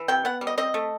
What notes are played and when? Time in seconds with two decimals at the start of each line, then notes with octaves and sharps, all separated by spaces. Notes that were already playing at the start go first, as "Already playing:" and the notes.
Already playing: E3
0.08 C3 G5
0.25 B3 F#5
0.41 G3
0.47 D#5
0.58 C4 D#5
0.74 A3